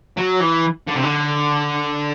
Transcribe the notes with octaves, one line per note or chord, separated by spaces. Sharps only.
F#3
E3
D3
C3
D3